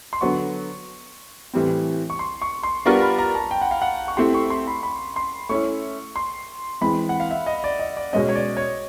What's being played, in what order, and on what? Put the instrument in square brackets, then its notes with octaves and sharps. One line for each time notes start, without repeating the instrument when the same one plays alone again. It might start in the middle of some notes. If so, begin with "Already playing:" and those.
[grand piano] C6
[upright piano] D3 F#3 B3 [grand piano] C#6
[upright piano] A2 E3 G3 C4
[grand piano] C#6
C6
C#6
C6
[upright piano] G3 B3 D4 F4 A#4 [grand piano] C#6
[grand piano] B5
A#5
A5
G5
F#5
F5
F#5
C#6
[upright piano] A3 C4 E4 G4 [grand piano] C6
[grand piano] C#6
C6
B5
B5
C6
[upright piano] A3 C#4 E4 [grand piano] C#6
[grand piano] C6
[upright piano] E3 G#3 C4 [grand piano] B5
[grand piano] F#5
F5
E5
D#5
D5
D#5
D5
[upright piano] B2 G#3 C#4 [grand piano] D#5
[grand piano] C#5
D5
C#5